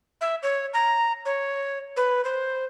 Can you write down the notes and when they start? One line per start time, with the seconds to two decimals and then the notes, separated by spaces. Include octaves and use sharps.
0.21 E5
0.43 C#5
0.74 A#5
1.25 C#5
1.97 B4
2.25 C5